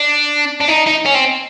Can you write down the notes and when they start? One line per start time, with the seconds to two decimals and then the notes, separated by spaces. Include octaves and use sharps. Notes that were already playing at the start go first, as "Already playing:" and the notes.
Already playing: D4
0.61 D4
0.68 D#4
0.87 D#4
1.06 C#4
1.15 C4